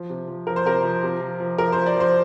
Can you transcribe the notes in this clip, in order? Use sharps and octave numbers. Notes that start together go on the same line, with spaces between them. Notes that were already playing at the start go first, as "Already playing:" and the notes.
Already playing: F3
C3
F3
F3 A#4
C5
C3 A#4
F3
C3
F3
F3
F3 A#4
C5
F3
D5
F3 C5